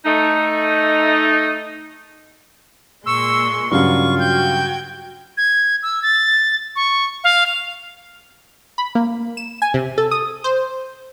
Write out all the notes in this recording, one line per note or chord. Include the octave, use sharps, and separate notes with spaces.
A3 D#4
A#2 G#3 C6 C#6 E6
G2 C#3 F#3 F4 C#6
F#4 G5 G6 G#6
G#6
E6
A6
C#6
F5
F7
B5
A#3
E7
G#5
C3
A4
D#6
C5